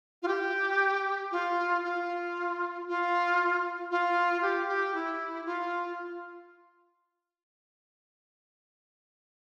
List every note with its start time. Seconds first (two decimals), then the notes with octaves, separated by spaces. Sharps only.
0.23 F4
0.28 G4
1.32 F4
1.84 F4
2.87 F4
3.91 F4
4.42 G4
4.68 G4
4.94 E4
5.46 F4